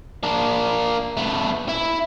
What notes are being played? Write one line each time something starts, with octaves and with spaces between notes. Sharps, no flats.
A#3 D4
A3 B3
E4